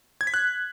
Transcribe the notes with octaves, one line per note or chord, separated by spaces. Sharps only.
G#6
B6
F#6